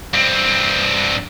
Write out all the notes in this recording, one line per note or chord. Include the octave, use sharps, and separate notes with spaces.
G2 C4